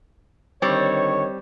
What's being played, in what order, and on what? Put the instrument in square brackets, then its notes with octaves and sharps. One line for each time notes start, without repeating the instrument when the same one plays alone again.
[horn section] D3 D#3 C#5 [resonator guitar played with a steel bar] G3 C4